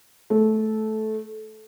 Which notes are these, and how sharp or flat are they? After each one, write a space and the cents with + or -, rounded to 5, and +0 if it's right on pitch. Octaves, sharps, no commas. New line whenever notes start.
A3 -15